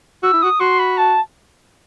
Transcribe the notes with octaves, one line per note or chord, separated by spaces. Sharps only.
F#4 E6
E4
F#4 D#6
F#4 C6
B5
A5